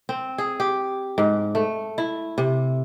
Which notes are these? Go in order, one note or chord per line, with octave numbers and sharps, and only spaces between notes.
C4
G#4
G4
G#2
A3
E4
C3